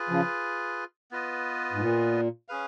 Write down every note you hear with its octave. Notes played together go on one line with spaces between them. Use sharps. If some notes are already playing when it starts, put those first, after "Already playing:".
Already playing: F4 G#4 B4
C#3 F3
B3 F4 B4 D#5
G#2
A#2
C#4 G#4 B4 F5